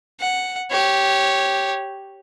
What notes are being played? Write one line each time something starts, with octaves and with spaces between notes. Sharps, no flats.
F#5
G4 C#5